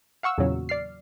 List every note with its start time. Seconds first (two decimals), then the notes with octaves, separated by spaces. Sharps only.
0.23 F5 F#5 C#6 E6
0.38 E2 A#2 C#3 F#3
0.69 D5 F6 C7